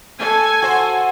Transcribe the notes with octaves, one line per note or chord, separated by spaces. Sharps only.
A4 G#5
F#4 C5